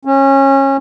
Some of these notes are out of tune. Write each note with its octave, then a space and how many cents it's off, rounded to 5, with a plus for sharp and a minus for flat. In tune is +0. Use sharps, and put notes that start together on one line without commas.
C#4 -25